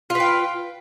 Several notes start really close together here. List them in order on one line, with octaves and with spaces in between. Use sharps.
F4 B4 G5